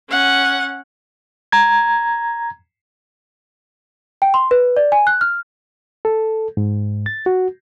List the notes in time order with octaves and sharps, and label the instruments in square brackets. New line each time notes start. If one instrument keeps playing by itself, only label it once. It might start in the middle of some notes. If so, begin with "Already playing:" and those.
[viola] C#4 F#5
[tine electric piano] A#5 G#6
[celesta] G5
C6
B4
D5
G#5
F#6
F6
[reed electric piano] A4
G#2
A6
F#4